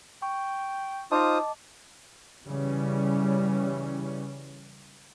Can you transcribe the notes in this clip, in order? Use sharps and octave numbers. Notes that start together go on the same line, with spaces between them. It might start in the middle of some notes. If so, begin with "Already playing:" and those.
G5 C#6
D#4 F4 C5 D#5 A5 D6 D#6
C#3 E3 G3 C#4